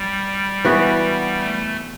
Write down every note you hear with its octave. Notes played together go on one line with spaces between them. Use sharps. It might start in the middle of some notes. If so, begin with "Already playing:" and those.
Already playing: G3
E3 B3 F#4 B4
A3